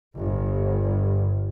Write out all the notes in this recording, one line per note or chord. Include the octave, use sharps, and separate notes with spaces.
G1